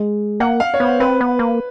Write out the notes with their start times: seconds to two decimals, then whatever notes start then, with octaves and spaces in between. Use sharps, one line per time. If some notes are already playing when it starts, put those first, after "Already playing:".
Already playing: G#3
0.40 A#3 F#5
0.60 F5
0.74 C#5
0.80 B3 C5
1.00 C4 B4
1.21 B3
1.39 A#3